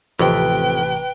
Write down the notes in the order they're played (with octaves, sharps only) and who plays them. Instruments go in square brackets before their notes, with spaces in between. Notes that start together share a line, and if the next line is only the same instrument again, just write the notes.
[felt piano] A1 C3 A5 [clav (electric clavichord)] F2 [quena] B4 [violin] G5